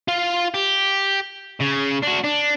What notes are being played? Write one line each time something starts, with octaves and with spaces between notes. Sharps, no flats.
F4 F5
G4
C#3
D4 F#4
D4